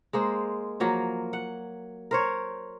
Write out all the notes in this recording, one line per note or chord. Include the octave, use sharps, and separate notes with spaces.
G#3 A#3 C5
F3 F#3 A#3
F#5
A#4 C5 C#5